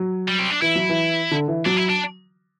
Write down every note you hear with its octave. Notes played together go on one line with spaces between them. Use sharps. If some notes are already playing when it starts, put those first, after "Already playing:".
Already playing: F#3
G3
C4
D4
E3 E4
F#3
E3
D3
E3
F#3 D4
E4
D4